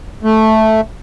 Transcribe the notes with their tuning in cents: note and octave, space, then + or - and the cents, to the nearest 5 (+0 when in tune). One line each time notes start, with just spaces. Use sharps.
A3 -5